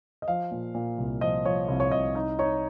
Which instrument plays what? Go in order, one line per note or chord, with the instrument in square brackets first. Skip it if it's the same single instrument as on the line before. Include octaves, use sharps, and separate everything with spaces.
[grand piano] D#5
F3 F5
A#2
A#2
C2
F3 D#5
F3 C#5
C2
C#5
C2 D#5
D#4 D#5
D#4 C#5